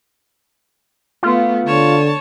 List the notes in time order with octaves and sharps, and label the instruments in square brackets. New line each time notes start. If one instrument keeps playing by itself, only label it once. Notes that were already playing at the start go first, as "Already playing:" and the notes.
[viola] A3 B3 [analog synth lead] F4
[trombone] D3 [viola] C#5 A5